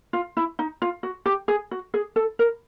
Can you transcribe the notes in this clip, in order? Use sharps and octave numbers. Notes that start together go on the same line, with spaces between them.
F4
E4
D#4
F4
F#4
G4
G#4
F#4
G#4
A4
A#4